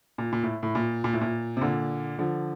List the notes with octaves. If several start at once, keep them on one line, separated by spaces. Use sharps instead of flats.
A#2
A#2
A2
A2
A#2
A#2
A2
A#2
C3
A#2 D3
D3 F3